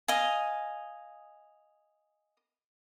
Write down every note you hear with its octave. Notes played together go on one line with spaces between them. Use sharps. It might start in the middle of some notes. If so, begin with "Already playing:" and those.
D#5 F5 G#5